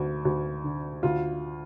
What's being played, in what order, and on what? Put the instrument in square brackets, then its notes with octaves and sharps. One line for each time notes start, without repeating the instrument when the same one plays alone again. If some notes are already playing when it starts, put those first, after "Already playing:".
Already playing: [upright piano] D2
D2
D3
D2 F4